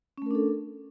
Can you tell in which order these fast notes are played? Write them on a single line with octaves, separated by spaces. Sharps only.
C#4 A3 A#4 D4 A4